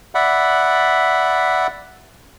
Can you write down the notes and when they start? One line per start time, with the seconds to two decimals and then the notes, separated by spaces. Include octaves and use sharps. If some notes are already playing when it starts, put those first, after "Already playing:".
0.15 D5 E5 F#5 B5